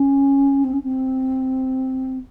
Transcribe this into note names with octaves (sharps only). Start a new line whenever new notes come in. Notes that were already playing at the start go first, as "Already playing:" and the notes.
Already playing: C#4
C4
C#4
C4